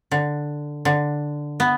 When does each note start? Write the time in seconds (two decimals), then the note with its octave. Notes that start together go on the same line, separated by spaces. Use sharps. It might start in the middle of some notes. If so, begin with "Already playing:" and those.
0.11 D3
0.85 D3
1.60 B3